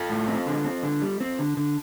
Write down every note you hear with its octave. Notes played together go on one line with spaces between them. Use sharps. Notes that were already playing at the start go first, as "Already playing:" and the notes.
Already playing: F4 A4
A2
C4
D3
C4
D3
G3
C4
D3
D3